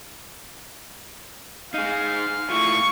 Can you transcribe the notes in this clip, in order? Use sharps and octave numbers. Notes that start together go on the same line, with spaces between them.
D#4 G#4 F5
A2 E4 F4 C#6